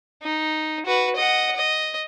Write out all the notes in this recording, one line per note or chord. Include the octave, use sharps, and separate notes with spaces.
D#4
F#4 B4
D#5 F#5
D#5